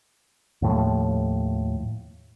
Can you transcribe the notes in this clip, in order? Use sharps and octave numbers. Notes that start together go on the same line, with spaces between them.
D#2 A2 F3